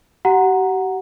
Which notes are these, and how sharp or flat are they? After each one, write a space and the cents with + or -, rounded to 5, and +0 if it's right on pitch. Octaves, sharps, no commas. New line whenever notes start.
G4 -40 F#5 +0 A#5 +5